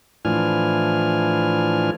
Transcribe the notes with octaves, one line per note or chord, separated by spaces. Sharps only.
A2 E3 F3 D4 G#5 F6